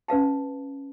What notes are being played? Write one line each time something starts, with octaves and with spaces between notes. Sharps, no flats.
C#4 B4 F5 A5